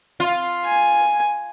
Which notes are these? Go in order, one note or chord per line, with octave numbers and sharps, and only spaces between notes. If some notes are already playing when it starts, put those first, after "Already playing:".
F4
G#5